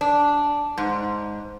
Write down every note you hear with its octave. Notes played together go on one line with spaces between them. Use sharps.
D4
G#2